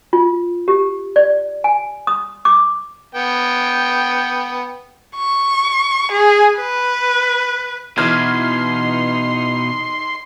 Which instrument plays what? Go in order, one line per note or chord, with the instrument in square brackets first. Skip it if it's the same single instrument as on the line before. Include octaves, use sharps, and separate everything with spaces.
[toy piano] F4
G4
D5
G#5
D#6
D6
[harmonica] B3 G5
[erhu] C#6
G#4
B4
[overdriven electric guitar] B2 [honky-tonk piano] E3 F6 G#6 [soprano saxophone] D#4 [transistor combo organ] C6